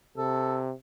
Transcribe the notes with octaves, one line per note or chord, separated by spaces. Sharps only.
C3 A4